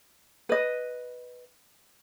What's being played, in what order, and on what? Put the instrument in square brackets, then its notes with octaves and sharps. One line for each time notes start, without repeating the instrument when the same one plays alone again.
[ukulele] B4 D#5